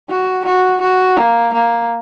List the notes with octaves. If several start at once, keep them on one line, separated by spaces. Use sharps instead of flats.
F#4
F#4
F#4
A#3
A#3